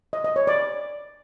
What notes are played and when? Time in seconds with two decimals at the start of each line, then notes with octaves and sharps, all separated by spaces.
0.13 D#5
0.24 D#5
0.36 C#5
0.47 D5